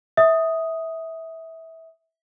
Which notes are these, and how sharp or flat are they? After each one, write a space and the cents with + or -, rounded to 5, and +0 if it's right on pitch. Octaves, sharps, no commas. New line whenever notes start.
E5 -20 D#6 +0